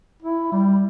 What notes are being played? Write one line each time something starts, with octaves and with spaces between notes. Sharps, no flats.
E4
G3